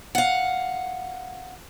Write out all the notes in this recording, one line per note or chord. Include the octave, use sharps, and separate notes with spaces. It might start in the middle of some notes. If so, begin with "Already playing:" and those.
F5 F#5